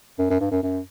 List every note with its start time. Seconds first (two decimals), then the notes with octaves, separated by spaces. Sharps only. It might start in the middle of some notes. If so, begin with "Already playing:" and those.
0.19 F#2
0.30 F#2
0.40 G2
0.51 F#2
0.63 F#2